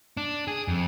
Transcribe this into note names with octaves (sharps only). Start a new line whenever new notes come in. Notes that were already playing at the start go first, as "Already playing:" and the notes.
D4
G#4
F2